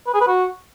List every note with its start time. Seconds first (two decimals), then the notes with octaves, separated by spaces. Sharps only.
0.07 B4
0.14 G#4
0.21 B4
0.28 F#4